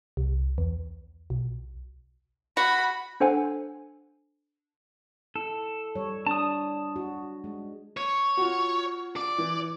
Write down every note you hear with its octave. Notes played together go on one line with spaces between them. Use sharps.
C2
E2
B1
F#4 B5
D4 A4 C5 F#5 G#5
E4 A4
G3 C#5
D4 A5 D#6
F#4
G#3
C#5
F4 F#4
D5
E3